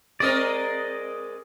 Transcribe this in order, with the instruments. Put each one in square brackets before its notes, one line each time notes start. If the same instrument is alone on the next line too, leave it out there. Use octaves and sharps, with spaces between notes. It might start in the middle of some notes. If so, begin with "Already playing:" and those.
[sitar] G#3 C4 A#4 [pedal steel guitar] D5 D#5